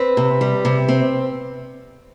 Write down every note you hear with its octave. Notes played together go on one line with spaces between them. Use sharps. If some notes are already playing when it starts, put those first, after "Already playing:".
Already playing: C4 B4
C3
G3
C3
C4